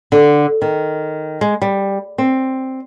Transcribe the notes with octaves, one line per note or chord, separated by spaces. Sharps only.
D3
D#3
G#3
G3
C4